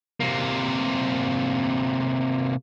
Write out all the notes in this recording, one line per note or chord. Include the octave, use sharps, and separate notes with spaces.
C3 A#3